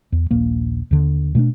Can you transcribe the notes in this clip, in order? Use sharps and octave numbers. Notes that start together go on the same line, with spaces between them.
E2
D#1 A#1 A#3
D#2 D3
B2 A3 A#3 D4